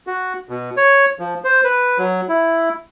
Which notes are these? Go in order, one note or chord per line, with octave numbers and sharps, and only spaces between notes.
F#4
B2
C#5
F3
C5
B4
F#3
E4